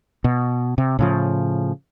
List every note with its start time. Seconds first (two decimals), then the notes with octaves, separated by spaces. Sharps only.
0.24 B2
0.78 C3
0.99 A2 C#3 F3